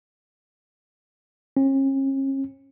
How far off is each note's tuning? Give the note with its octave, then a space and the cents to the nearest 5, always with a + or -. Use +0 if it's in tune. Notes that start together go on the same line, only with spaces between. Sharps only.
C#4 -40